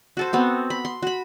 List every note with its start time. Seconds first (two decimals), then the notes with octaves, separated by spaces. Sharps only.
0.17 F#4 A4 C5
0.33 B3 C4 F#4
0.70 B5
0.85 C6
1.03 F#4 B5